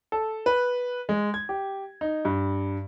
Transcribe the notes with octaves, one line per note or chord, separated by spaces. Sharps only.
A4
B4
G#3
G#6
G4
D#4
G2